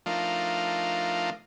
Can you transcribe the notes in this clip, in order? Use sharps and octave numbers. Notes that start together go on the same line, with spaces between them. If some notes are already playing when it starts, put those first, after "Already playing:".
F3 A3 D4 D#4 F4 A#4